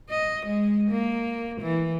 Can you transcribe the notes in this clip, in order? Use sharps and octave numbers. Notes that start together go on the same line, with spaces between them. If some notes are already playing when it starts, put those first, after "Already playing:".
D#5
G#3
A#3
E3